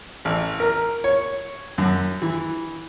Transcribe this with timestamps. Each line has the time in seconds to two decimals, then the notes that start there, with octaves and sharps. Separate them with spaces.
0.25 A1
0.60 A#4
1.04 C#5
1.78 F#2
2.22 E3